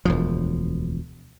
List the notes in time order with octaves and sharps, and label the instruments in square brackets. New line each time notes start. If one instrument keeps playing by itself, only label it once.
[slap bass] E1 D2 F3